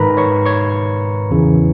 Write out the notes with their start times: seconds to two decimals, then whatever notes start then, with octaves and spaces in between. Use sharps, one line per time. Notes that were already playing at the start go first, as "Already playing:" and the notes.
Already playing: G#2 D#3 A#4 B4 A#5 B5
0.17 C#5 C#6
0.46 C#5 C#6
1.31 E2 C#3 E3